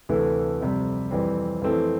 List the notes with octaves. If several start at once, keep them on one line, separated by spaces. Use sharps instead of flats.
D2 C3 E3 A3 E4
F2 C3 G3
F2 E3 G3 C4
F2 E3 A3 C4 E4